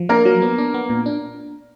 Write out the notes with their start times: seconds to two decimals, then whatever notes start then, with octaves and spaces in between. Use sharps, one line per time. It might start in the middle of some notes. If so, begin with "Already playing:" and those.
Already playing: F3
0.09 A#3 D4 A#4
0.25 F#3
0.42 B3
0.58 D4
0.74 B3
0.90 A#2
1.06 D4